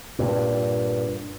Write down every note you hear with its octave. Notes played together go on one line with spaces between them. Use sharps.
G2 A#2